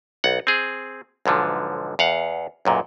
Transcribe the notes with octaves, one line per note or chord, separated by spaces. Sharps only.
B1 F#5
C4 G#4
B1 G#2 D3 F3
E2 F5 F#5
B1 F#2 A#2